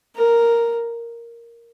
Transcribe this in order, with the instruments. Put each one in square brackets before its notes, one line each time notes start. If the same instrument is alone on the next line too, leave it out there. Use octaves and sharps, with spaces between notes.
[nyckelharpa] A#4